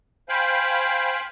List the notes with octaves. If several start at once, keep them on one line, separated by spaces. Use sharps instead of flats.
C5 F5 G5 G#5 B5